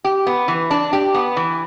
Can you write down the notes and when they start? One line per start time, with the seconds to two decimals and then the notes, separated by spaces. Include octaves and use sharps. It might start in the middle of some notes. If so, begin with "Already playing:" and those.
0.04 G4
0.27 B3
0.48 E3
0.70 D4
0.93 G4
1.14 B3
1.37 E3